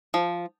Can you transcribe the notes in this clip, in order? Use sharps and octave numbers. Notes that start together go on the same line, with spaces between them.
F3